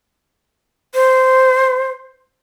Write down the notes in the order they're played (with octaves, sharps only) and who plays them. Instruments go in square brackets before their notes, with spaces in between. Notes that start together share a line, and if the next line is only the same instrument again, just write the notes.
[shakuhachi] C5